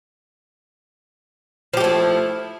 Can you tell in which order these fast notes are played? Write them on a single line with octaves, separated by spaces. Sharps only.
F3 G4 A3 E4